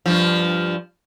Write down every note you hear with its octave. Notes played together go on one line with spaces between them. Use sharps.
G2 F3